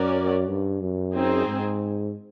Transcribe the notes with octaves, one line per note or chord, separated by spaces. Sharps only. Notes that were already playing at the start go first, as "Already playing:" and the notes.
Already playing: F#2 C#4 F#4 A#4 D5
G2
F#2
C4 D#4 G#4
G#2